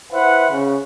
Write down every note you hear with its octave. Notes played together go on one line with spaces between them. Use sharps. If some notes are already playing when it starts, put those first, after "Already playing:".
E4 B4 C5 E5 F#5
C#3